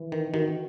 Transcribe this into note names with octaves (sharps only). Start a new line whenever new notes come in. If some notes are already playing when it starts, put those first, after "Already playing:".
Already playing: E3
D#3
D#3 F#4